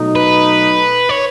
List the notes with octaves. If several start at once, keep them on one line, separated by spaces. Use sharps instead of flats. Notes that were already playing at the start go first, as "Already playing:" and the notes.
Already playing: B2 F#3 A3 D#4
B4
C#5